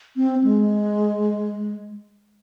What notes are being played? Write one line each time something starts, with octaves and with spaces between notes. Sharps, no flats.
C4
G#3